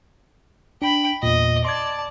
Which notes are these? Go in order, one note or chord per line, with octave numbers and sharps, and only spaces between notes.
D4 G5 B5
E2 A#2 D#5
D5 A5 C6 G#6